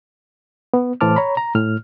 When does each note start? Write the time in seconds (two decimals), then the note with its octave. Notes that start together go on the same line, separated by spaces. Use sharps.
0.74 B3
1.01 A2 E3 C5 A5 D6 F6
1.16 C#5 A#5 B5
1.37 A#5
1.55 A2 F6